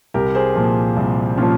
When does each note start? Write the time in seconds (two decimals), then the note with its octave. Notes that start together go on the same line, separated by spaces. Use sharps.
0.14 C2 G4 A#4
0.35 G#4 C5
0.55 A#2 F3
0.96 C2
1.38 A#2 F3 C#4 F4